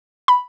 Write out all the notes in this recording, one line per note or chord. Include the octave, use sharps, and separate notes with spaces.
B5